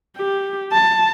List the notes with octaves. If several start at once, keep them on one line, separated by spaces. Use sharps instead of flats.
G4
A5